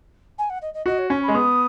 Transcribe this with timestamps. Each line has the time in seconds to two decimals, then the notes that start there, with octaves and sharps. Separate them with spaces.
0.38 G#5
0.49 F#5
0.62 D#5
0.74 D#5
0.86 F#4 D#5
0.98 C#5
1.10 C#4 C#5
1.23 B5
1.28 G#3
1.34 B3 D#6